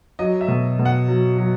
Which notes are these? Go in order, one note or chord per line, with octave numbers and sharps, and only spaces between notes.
F#3 D#5
E5
B2
B2
F#5
F#3
F#3